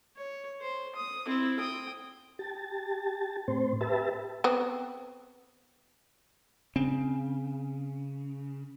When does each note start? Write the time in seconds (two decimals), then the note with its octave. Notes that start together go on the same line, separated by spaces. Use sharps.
0.17 C#5
0.61 C5
0.96 D#6
1.27 C4 E4
1.59 G5 D#6
2.39 G4 A5
3.48 A2 C4 C5
3.81 G4 B4 E5 A5
4.44 B3 C4
6.76 C#3 C4